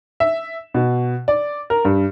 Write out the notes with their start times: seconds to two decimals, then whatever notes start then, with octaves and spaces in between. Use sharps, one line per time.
0.20 E5
0.74 B2
1.28 D5
1.70 A#4
1.85 G2